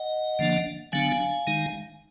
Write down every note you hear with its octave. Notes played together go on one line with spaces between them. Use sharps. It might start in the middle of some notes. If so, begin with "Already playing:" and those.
Already playing: D#5 F#5
D3 F3 A#3 D4
D3 F#3 B3 D4 F5 G#5
D#3 G#3 D#4